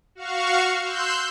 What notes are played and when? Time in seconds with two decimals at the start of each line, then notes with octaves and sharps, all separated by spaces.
0.15 F#4 F5 C#6
0.83 C6 E6 F#6 G6